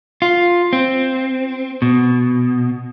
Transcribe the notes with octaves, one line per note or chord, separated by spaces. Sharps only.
F4
C4
B2